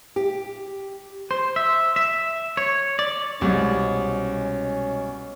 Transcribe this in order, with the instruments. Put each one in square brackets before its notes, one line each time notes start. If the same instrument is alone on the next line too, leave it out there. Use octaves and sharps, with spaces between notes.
[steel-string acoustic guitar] G4
[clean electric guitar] C5
E5
E5
C#5
D5
[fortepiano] C2 [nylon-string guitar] B2 G#3 D#5 [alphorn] C#4